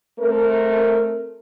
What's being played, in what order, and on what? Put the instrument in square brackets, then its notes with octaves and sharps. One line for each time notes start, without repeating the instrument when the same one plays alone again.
[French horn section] A3 C4 A#4